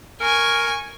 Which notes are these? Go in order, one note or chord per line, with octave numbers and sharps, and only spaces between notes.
A#4 G#5 C#6